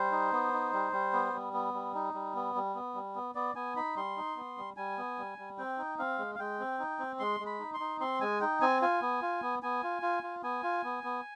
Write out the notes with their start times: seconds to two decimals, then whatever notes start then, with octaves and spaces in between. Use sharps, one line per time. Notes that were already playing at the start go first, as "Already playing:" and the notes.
Already playing: G3 C5
0.12 D#4
0.32 B3
0.53 D#4
0.73 G3
0.93 G3
1.13 B3
1.33 G3
1.53 B3
1.74 G3
1.94 D#4
2.14 G3
2.35 B3
2.55 G3
2.75 B3
2.95 G3
3.15 B3
3.35 B3 D5
3.55 B3 G#5
3.76 D#4 B5
3.96 G3 C6
4.17 D#4
4.36 B3
4.58 G3
4.77 G3 G#5
4.97 B3
5.18 G3
5.38 G3
5.58 C4 G5
5.78 D#4
5.99 C4 F5
6.18 G#3
6.35 F5
6.39 G#3 G5
6.59 C4
6.79 D#4
6.99 C4
7.19 G#3 C6
7.40 G#3
7.46 B5
7.60 D#4
7.74 C6
7.80 D#4
8.00 C4 C6
8.21 G#3 G#5
8.41 D#4 G5
8.61 C4 G#5
8.82 F4 G#5
9.02 B3
9.22 F4
9.42 B3
9.63 B3 G#5
9.83 F4
10.02 F4
10.23 F4
10.43 B3 G#5
10.63 F4
10.84 B3
11.04 B3